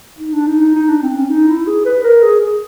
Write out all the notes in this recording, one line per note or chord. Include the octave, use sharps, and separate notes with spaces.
D#4
D4
D#4
D#4
D#4
D4
C4
C#4
D#4
E4
G#4
B4
A#4
G#4
G#4